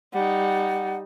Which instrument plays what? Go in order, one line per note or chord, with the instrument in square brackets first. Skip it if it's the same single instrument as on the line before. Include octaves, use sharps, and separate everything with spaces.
[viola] G3 D#4 [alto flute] F#5